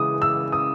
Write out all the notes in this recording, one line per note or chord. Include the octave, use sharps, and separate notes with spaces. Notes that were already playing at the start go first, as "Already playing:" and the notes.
Already playing: C#3 E3 G#3 D#6
E6
D#6